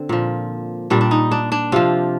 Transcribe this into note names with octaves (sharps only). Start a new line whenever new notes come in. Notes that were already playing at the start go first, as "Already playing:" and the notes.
Already playing: D3 C4
A#2 F3
A#2 G3 D4
D4
D#4
D4
D4
C3 F3 F4